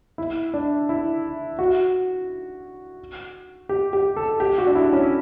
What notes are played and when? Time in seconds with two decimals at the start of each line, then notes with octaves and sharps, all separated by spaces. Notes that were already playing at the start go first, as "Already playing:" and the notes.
0.18 E4
0.54 D4
0.89 E4
1.59 F#4
3.69 G4
3.93 G4
4.16 A4
4.40 G4
4.58 F#4
4.67 D4
4.75 E4
4.93 C#4